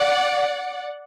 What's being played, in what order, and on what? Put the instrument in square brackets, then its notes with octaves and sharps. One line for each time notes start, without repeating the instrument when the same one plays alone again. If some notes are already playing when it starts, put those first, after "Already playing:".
Already playing: [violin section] D5 F#5